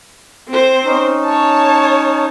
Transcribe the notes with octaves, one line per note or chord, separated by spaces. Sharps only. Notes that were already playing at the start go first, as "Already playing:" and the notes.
C4 C5
C#4 D#4
C#5 A5